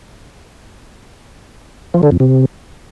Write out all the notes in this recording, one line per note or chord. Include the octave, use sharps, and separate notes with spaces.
F3
D3
F2
C3